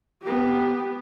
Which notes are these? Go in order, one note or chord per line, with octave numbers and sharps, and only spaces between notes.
B3 G4